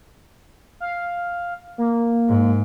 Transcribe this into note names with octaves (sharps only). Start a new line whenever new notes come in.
F5
A#3
G#2